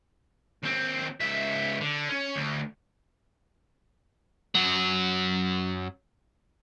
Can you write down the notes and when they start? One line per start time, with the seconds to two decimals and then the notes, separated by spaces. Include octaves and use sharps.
0.63 D#2 C4
1.20 C#2 E5
1.81 D3
2.09 C#4
2.36 D2
4.55 F#2 F#3